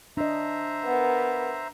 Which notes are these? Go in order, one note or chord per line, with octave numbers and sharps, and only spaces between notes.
D4 C5 D#5 E5 A#5
B3 A#4